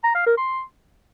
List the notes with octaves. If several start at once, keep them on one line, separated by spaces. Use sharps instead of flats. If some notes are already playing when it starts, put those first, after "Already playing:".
A#5
F5
A#4
C6